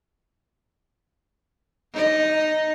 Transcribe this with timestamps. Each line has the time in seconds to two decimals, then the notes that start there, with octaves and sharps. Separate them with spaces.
1.93 D#4 D#5